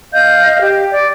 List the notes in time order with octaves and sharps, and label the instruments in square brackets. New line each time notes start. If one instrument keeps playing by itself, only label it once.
[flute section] D#5 F5 G6
G4
D5